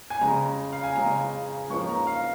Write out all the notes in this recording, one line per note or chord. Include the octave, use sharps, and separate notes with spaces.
G#5
F2 C#3 G#3 C#4 A#5
F5
G#5
F2 C#3 G#3 C#4 A#5
G#2 F3 A#3 C#4 C#6
A#5
F5